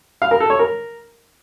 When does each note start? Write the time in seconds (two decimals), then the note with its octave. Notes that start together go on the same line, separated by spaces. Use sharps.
0.22 F5
0.31 A#4
0.40 A4
0.50 C#5
0.59 A#4